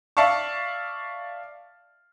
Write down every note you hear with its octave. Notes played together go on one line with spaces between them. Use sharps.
D5 E5 F5 A5 C#6